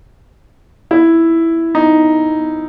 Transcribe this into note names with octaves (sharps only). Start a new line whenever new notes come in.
E4
D#4